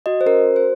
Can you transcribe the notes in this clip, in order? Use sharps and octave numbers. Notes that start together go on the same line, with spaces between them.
F#4 D#5
C5
C#4 A#4
F#4
C5